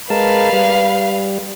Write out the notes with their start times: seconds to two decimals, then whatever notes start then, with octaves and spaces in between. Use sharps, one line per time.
0.10 G#3 A#4 B4 F5 A5
0.53 G3